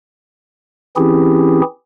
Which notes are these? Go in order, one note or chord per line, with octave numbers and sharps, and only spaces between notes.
E3 C4 C#4 E4 G4 G#4